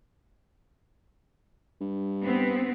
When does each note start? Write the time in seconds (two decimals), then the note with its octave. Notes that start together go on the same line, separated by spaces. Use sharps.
1.80 G2
2.24 B3 C4